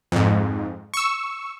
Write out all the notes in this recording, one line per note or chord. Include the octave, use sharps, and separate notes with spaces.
F2 G#2
C#6 E6